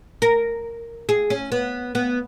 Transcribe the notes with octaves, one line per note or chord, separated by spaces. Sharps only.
A#4
G#4
C#4
B3
B3